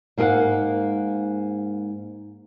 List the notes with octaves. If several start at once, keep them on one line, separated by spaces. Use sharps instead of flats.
G#2 A#3 E4 G#4 F5 F#5